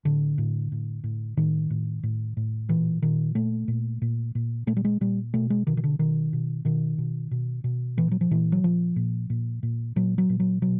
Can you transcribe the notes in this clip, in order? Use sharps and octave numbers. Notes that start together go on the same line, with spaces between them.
A2 D3
A2
A2
A2
A2 D#3
A2
A2
A2
A#2 E3
A#2 D#3
A#2 A3
A#2
A#2
A#2
A#2 A3
G3
G#3
A#2 G3
B2 A3
G#3
B2 D#3
D#3
D3
B2 D#3
B2
B2 D#3
B2
B2
B2
A#2 E3
F#3
F3
A#2 E3
F#3
A#2 F3
A#2
A#2
A#2
A#2 F#3
F#3
A#2
F#3
B2 F#3